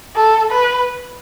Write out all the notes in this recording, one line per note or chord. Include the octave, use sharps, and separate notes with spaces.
A4
B4